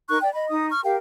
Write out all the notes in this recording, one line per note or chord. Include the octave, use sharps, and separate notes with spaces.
D#4 A#4 C#6 F#6
D5 G5
D#5 B5
D#4 D#6
C#6 F6
G4 A#4 F5 G5